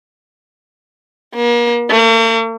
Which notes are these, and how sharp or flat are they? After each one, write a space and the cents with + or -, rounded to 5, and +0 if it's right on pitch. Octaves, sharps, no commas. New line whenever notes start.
A#3 +40
A#3 -45